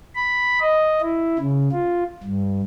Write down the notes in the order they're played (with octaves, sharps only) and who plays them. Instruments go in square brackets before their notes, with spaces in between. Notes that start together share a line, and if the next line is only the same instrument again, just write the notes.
[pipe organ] B5
D#5
E4
C#3
F4
G2